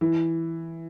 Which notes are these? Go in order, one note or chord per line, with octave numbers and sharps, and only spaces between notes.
E3